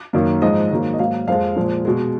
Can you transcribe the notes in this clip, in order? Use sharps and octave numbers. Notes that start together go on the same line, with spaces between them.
F#2 D#3 A#3
G#2 F3 G#3 D#5
G#2 D#3 F#3 A#3
D#5
G#2 F#3 A#3 F5
F2 F3 G#3 F5
A#2 F3 G#3
B2 G#3